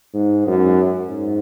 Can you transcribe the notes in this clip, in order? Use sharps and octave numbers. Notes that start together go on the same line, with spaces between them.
G#2
F#2
G#2